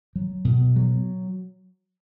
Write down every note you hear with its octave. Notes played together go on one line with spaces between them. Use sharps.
F#3
B2
F#3